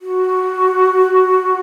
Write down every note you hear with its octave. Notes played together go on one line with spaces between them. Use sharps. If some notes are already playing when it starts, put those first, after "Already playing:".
F#4